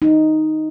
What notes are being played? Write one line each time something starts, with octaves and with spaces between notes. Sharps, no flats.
D#4